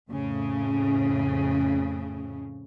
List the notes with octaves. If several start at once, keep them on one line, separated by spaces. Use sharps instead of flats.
F2 A2 C#3